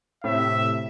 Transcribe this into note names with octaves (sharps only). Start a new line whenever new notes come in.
A2 C3 E5